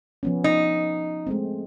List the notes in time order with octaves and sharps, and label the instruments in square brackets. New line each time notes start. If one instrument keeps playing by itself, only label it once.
[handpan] F3 B3 C#4
[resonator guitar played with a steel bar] D#4
[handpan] G#3 A3 C4